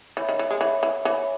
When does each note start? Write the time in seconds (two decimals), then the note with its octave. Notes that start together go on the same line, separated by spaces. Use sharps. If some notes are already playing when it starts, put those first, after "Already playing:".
0.17 E3 C#5 E5 B5
0.29 D#3
0.39 E3
0.51 G#3
0.61 E3 C#5 E5 B5
0.83 E3
1.05 E3 C#5 E5 B5